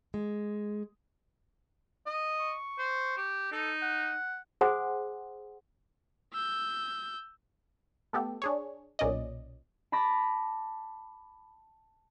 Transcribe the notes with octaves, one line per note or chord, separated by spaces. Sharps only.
G#3
D#5
C#6
C5
G4
D#4 A4
F#5
G#4 C5 F#5 G#5 C6 D#6
E6 G6
A3 B3 G4 A4
D4 G#4 C#5
B1 A#2 C#4 D5 D#5
A5 B5 D6 A#6